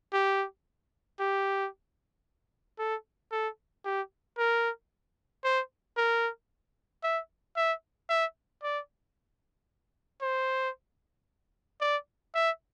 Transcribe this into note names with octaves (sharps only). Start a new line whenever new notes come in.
G4
G4
A4
A4
G4
A#4
C5
A#4
E5
E5
E5
D5
C5
D5
E5